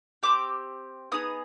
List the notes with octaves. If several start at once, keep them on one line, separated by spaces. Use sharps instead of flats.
C4 G4 D6
B3 D#4 G#4 D#6